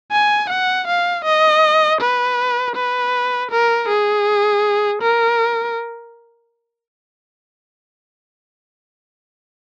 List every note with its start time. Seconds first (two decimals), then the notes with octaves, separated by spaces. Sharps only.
0.12 G#5
0.50 F#5
0.87 F5
1.25 D#5
2.01 B4
2.76 B4
3.51 A#4
3.89 G#4
5.02 A#4